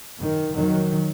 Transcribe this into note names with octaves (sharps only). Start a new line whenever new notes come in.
F#2 D#3
F2 D#3 F#3